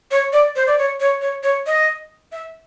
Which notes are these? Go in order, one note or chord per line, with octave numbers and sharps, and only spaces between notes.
C#5
D5
C5
D5
C#5
C#5
C#5
C#5
D#5
E5